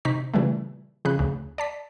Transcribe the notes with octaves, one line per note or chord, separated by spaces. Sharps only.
C3 D#4 C5 A#5 C#6 B6
A#2 C#3 E3 G3 A3
F2 C#3 G#4 B5 F#6
D2 C#3
D5 A5 B6